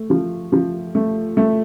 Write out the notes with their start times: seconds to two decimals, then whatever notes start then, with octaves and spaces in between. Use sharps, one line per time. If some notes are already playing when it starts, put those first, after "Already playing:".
Already playing: A3
0.10 F3
0.52 F3
0.95 A3
1.37 A3